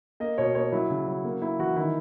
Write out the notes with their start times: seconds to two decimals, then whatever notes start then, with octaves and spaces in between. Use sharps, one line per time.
0.20 A#3 D#5
0.38 B2 C#5
0.55 A#3 C#5
0.72 F#3 E4
0.90 C#3
1.08 F#3
1.24 A#3
1.41 A#3 E4
1.59 E3 F#4
1.76 D#3 E4